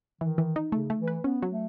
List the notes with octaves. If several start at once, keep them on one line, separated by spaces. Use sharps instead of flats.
D#3 E3
E3
D#4
C#3 A3
A3
E3
B4
B3 C#4
F#3
A3